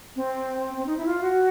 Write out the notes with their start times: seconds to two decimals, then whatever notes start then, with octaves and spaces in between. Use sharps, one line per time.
0.16 C4
0.76 C4
0.86 D#4
0.97 E4
1.06 F4
1.21 F#4